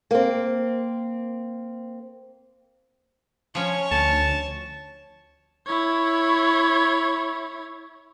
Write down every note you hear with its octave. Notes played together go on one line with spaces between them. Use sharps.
A#3 C4
F3 C#4 C#5 C#6
D2 A5
E4 C#5